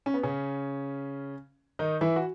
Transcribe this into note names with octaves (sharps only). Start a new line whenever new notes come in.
C#4
B3
C#3 C#4
D#3 D#4
E3 E4
F#4